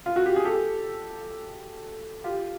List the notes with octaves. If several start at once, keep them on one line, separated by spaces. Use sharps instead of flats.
F4
F#4
G4
G#4
G4 A4
F4 G4